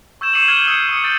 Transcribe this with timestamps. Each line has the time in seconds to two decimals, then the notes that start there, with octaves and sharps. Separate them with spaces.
0.21 C#6 E6 G6 G#6 E7
0.33 D6 C7 C#7 D#7 E7 F#7
0.48 F6 G#6 D#7 G7
0.67 D#6 E6 C#7 E7
0.89 C#6 D#6 C#7
1.03 D#6 E6 G6 A6 D7